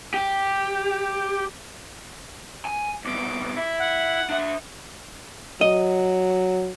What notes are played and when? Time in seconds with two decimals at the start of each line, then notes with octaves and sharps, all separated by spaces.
0.14 G4
2.65 G#5
3.05 C2 B2 D6
3.57 E4
3.79 F#5
4.30 D4 E5
5.61 F#3 D#5